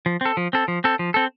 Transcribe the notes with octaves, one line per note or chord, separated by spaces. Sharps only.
F3
C4 A4
F3
C4 A4
F3
C4 A4
F3
C4 A4